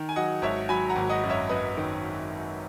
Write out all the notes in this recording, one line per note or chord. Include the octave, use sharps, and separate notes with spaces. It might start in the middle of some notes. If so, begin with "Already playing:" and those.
Already playing: D#3
G#5
F#3 D#5 F#5
G#1 C#5 E5
F#3 G#5 B5
F#5 A#5
G#1
D#5 F#5
F#2
C#5 E5
F#2 B4 D#5
D#3